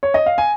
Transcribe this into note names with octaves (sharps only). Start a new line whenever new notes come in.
C#5
D#5
F5
G#5